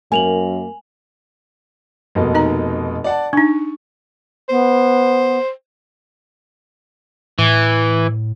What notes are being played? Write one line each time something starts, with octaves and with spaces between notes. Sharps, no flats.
F#2 A#3 G#5 F7 F#7
F1 B2 A#3
D#4 D#5 A#5
D5 F#5 A5
D4 D#4 C#6
B3 C5
A2 E3